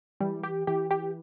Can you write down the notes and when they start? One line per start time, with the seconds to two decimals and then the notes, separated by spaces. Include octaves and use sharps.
0.20 E3 G3
0.43 G4
0.67 E3 G4
0.91 G4